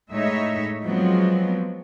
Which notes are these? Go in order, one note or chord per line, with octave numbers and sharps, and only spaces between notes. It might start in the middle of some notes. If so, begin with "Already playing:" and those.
A2 G#3 D#4 C#5 E5
F3 F#3 G#3 B3 C4